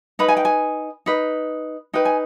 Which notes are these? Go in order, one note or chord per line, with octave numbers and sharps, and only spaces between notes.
D#4 B4 B5
G#5
G5
G#5
D#4 B4
D#4 B4 G5
G#5